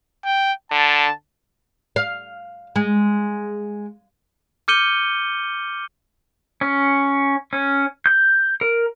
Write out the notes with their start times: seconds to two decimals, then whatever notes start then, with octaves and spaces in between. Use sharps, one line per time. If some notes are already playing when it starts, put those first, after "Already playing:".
0.25 G5
0.71 D3 A5
1.96 F5
2.76 G#3
4.68 D6 F6 G6 C#7 D#7 G7
6.61 C#4
7.53 C#4
8.06 G6
8.61 A#4